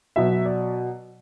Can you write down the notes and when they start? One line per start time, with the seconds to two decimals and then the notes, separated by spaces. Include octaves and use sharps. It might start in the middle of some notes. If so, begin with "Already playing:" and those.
0.16 B2 F#3 E5
0.45 D5